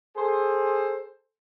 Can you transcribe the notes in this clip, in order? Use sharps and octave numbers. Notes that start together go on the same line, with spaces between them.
G#4 A4 C5